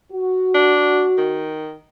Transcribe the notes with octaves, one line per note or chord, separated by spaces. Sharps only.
F#4
D4
D#3